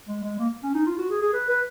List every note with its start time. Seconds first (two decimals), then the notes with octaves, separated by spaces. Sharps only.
0.08 G#3
0.23 G#3
0.39 A#3
0.63 C#4
0.74 D#4
0.86 F4
0.98 F#4
1.10 G#4
1.22 G#4
1.33 B4
1.49 B4